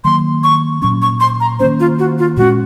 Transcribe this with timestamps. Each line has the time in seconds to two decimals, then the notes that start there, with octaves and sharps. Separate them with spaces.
0.04 D#3 F#3 A#3 C6
0.43 C#6
0.82 A#2 F#3 C#4 C#6
1.02 C#6
1.20 C6
1.40 A#5
1.59 D#3 A#3 C#4 C5
1.80 F4
1.99 F#4
2.19 F4
2.37 A#2 G#3 C#4 F#4